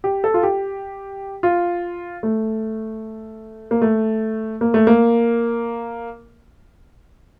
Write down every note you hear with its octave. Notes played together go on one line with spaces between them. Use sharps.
G4
A4
F4
G4
F4
A3
A#3
A3
A#3
A3
A#3